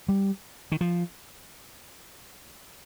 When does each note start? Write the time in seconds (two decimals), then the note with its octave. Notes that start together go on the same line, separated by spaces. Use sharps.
0.09 G3
0.72 D#3
0.81 F3